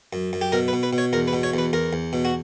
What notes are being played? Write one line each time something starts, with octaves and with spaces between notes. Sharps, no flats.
F#2
F#2
G4
B2 A#4
B4
B2
B4
B2
C#5
E2 A#4
B4
B2
C#5
E2 B4
E2 A#4
E2
B2
F#4